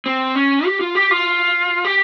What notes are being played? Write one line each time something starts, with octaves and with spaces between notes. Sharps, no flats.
C4
C#4
G4
F4
G4
F4
G4